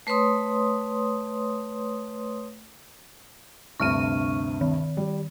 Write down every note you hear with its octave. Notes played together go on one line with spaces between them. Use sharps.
A3 B4 C#5 C6 D#6
D2 G2 C3 C#6 F6 D#7
D#3
G3